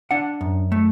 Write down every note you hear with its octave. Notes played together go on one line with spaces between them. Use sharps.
D4 F#5
F#2
A3